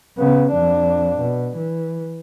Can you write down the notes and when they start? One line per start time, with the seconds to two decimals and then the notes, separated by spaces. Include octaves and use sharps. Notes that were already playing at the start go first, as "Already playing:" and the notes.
0.18 C#3 B3
0.52 F2 D4
1.20 B2
1.57 E3